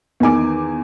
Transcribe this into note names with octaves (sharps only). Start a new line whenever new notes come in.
E2 D#3 G#5 D6